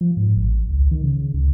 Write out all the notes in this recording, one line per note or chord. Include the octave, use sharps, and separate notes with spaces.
F3
G#2
A1
C#2
D#3
C#3
C#2